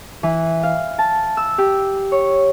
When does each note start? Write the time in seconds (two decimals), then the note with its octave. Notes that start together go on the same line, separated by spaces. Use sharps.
0.23 E3
0.63 F5
0.98 A5
1.37 E6
1.58 G4
2.12 C#5